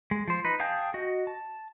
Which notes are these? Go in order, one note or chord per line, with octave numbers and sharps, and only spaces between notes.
G#3
F3 C5
D#4 B4
G#4 F5 G5 A5 G6
F#4 D#5
A5